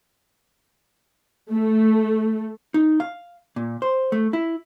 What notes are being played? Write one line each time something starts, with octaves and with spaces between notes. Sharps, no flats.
A3
D#4
F5
A#2
C5
A3
E4